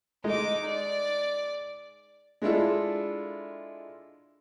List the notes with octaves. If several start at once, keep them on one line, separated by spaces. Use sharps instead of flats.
G#3 D#4 D6
D5
G#3 D4 E4 F4 A4